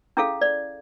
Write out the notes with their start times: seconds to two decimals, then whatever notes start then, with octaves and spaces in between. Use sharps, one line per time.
0.17 C#4 E4 G#4 A4 F5
0.41 D5